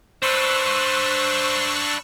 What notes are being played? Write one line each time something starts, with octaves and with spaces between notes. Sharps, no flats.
D4 B4 C5 C#6 E6 F#6